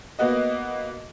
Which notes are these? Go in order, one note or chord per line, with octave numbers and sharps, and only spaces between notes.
A#3 B3 F#4 D#5